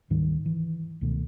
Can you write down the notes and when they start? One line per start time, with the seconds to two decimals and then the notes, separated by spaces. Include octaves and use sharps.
0.10 D2 G#2 D#3 G3
0.46 E3
1.01 C#2 B2 D#3 A3